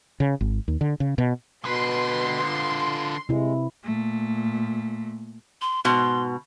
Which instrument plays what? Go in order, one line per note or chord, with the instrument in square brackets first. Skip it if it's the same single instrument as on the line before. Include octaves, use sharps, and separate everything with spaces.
[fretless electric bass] C#3
G#1
D#2
D3
C#3
B2
[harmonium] B2 [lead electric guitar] D3 B4 [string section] C6
[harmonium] F4
[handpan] C3 E4 [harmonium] G#3
[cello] A#2 A3
[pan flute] C6
[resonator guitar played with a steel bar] G#2 B2 [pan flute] C6